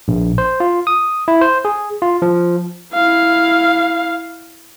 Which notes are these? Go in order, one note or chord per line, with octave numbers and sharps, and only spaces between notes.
A#1
C5
F4
D#6
E4
C5
G#4
F4
F3
E4 F5